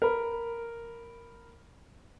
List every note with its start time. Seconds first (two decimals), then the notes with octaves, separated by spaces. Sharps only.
0.02 A#4 B5